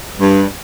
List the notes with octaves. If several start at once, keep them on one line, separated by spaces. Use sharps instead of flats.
G2